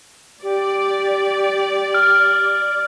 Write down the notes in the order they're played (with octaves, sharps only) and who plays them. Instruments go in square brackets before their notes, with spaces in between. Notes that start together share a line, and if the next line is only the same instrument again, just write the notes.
[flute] G4 [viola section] D5
[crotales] F6